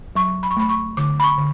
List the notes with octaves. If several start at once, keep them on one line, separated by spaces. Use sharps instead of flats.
F#3 C#6
B5
C#6
A3 B5
C#6
D3 D6
B5
C#6
D3